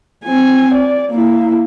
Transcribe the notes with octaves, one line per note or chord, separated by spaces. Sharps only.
C4 G#5
D5
A#3 E4